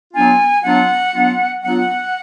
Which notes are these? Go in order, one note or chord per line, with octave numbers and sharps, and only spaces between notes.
F#3 B3 D4 F4 G#5
F#3 B3 D4 F4 F#5
F#3 B3 D4 F4
F#3 B3 D4 F4 F#5